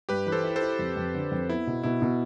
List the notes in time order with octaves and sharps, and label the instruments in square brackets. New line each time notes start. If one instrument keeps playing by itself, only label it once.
[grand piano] G2 [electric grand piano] G4 B4
[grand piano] E3 [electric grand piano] B4
[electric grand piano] A4 C5
[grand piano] E4
[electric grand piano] A4 C5
[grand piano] E4
F2
F2
D3
F2
[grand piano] B3 [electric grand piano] E4
[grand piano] B2
[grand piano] B2 [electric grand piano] E4
[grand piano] B2